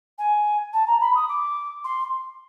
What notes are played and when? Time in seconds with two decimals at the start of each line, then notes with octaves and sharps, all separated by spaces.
0.18 G#5
0.73 A5
0.87 A#5
1.01 B5
1.15 D#6
1.29 D6
1.84 C6